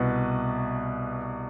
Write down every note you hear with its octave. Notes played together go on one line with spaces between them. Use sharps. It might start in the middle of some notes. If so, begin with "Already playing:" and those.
Already playing: C2 B2 B4